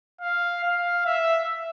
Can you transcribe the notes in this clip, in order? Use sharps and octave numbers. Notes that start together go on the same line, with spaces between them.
F5
F5
E5